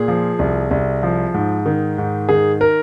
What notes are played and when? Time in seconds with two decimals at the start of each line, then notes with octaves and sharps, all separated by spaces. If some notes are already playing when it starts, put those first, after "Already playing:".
Already playing: A#2 G#4
0.08 F3
0.39 C2
0.71 C2
1.03 F3
1.34 G#2
1.66 D#3
1.98 G#2
2.29 D#3 G#4
2.61 A#4